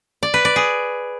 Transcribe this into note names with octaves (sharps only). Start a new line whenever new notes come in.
D5
B4
D5
G#4